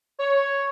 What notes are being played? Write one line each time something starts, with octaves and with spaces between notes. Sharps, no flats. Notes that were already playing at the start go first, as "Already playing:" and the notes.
C#5